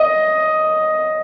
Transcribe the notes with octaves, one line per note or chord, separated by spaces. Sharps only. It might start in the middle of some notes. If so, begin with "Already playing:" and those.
Already playing: D#5